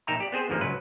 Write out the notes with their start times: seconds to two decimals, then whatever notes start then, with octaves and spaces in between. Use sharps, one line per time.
0.07 A#1 D#4 E5 G5 A#5
0.20 G4 D5
0.32 B3 C4 G#4 C5
0.49 A1 D2 G#2 F3 A#3
0.61 C#2 F#3 B4